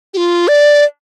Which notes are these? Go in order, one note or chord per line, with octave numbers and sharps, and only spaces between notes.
G4
F4
D5